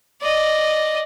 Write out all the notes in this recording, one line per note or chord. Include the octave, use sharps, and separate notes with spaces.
D5 D#5